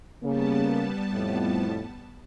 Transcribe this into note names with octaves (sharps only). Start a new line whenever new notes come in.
C#3 G3 A#3 B3 A5
F2 A2